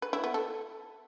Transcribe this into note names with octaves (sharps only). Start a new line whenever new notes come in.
B4
E4
B3
A4